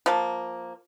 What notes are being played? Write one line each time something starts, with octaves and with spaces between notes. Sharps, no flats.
F3 A#3